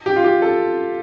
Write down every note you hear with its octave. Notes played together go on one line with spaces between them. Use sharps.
G4
F4
G4
A4